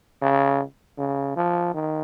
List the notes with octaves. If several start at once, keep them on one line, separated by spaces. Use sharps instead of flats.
C#3
C#3
F3
D#3